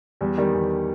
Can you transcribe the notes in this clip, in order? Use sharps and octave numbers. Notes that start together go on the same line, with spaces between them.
E2 G3
D#3 G3
E2